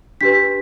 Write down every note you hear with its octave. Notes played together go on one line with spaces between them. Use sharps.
D4 G4 B4 B6